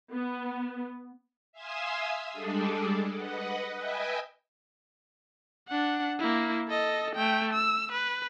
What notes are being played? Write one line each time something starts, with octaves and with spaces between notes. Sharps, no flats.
B3
E5 F5 G#5 C6 D#6 E6
G3 G#3 D4 G#4 A4 D5
B4 D#5 F#5
B4 D#5 E5 G5 G#5 B5
D4 F#5
A#3 E4
A4 D#5
A3 G5
E6
B4